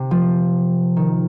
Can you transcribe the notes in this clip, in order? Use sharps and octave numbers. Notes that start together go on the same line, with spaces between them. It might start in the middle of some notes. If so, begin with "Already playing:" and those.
Already playing: C3
F3
D#3